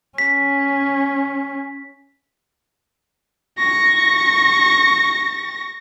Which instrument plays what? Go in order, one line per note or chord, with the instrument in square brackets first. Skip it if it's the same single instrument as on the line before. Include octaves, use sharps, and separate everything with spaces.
[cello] C#4 [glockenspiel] B6
[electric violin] C#6 A#6